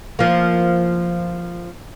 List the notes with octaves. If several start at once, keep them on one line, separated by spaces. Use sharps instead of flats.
F3 A#3